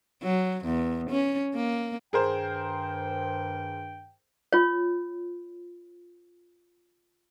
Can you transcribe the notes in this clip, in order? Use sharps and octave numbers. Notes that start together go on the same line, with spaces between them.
F#3
E2
C#4
A#3
G2 D#3 G#4 A#4 C5 G5
F4 C#5